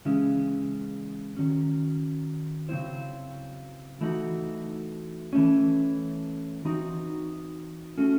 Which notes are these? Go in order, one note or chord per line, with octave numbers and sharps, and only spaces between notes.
C#3 E3 G#3 C#4
D#3 F#3 C#4
C#3 F#3 C4 E4 C5
E3 A3 D#4 F#4
E3 A3 C#4
E3 C4 D#4 F#4
A3 C#4 F#4 A4